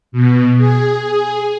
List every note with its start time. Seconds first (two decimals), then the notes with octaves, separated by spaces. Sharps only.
0.12 B2
0.58 G#4